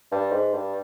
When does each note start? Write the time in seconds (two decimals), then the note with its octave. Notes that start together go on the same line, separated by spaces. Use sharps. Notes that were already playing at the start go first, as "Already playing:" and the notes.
0.12 G2
0.32 G#2
0.54 G2